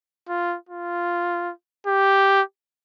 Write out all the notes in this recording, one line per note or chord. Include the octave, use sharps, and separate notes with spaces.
F4
F4
G4